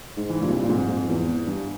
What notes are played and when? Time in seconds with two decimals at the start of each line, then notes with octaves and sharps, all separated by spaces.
0.17 G#2
0.29 E3
0.40 G2 A#2
0.50 C3
0.63 A#2
0.69 F2 G#2
0.88 F2
1.09 E2
1.47 G2